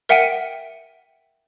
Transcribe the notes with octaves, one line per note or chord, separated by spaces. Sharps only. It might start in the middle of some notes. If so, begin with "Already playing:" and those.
A#4 E5 F#5 G5 D7 D#7